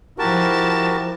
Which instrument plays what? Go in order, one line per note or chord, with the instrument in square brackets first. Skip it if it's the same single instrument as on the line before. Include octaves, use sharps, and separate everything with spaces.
[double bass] F3 E4 [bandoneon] F#4 G4 A#4 [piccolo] A5